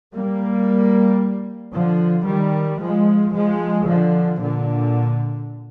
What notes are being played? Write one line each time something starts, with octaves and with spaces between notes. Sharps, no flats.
G3 A#3
D3 F3
D#3 G3
F3 G#3
F3 G#3
D3 F3
A#2 D3